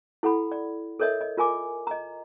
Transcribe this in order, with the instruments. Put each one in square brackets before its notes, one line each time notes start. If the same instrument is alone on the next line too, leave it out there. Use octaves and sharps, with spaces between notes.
[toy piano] E4 A4 F#5 B5
D5
A4 A#4 C#5 D#5 E5
D#5
F4 A#4 G#5 D6
D#5 A#5